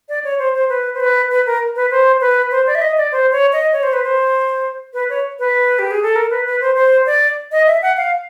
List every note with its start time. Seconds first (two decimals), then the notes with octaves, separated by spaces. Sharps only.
0.09 D5
0.24 C#5
0.39 C5
0.54 C5
0.69 B4
0.94 C5
1.00 B4
1.31 B4
1.46 A#4
1.76 B4
1.91 C5
2.21 B4
2.51 C5
2.67 D5
2.75 E5
2.82 D#5
2.97 D5
3.12 C5
3.32 C#5
3.53 D#5
3.72 C#5
3.83 C5
3.93 B4
4.04 C5
4.94 B4
5.09 C#5
5.39 B4
5.79 G4
5.91 G#4
6.02 A4
6.16 A#4
6.30 B4
6.46 B4
6.61 C5
6.76 C5
7.06 D5
7.52 D#5
7.67 E5
7.82 F#5
7.97 F5